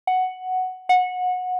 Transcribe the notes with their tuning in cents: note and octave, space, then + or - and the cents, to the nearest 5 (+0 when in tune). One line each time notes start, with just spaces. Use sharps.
F#5 +5
F#5 -20